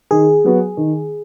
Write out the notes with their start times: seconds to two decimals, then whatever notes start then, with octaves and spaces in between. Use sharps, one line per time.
0.11 D#3 G#4
0.44 F#3 B3 F#4
0.77 D#3